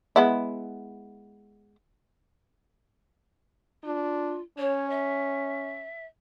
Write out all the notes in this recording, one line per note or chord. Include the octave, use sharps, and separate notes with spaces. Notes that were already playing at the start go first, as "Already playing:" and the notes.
G#3 B3 E4
D4 F4
C#4 C#5
E5